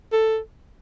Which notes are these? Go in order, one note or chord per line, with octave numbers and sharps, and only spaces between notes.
A4